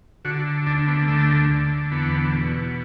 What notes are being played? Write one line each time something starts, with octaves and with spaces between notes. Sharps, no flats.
D3 F#4
D2 D4
B3
D3 A3
D3
E2 B3
B2